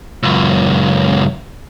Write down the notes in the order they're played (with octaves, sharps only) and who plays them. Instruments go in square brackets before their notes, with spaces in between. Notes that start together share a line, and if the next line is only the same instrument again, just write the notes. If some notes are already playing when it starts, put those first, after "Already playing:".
[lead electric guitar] C#2 F#2